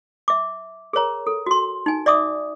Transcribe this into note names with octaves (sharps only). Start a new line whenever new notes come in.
E5 D6
G#4 A#4 C#5 A#5
A4
F#4 C6
D#4 G#5
D5 E5 D6 D#6